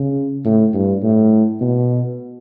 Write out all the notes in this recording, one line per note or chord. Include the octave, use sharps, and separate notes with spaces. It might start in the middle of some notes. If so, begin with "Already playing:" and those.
Already playing: C#3
A2
G2
A2
B2